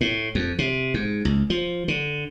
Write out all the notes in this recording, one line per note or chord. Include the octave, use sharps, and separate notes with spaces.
A2
F2
C3
G#2
C#2
F3
D3